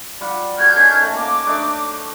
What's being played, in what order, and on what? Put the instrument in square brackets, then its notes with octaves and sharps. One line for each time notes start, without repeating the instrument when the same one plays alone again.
[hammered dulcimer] G3 F4 F#5
[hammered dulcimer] F#4 A4 [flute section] F6 G6 G#6
[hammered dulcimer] D#3 C#4
A3
[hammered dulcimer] A#3 [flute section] D6
[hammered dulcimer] A3 D4 D#4